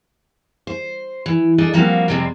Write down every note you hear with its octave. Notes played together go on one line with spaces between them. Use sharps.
C5
E3
D4 D#4 G#4 A4 D#5
F3 G3 A#3 C4 F#4 F5
F2 C3 G3 G#3 C4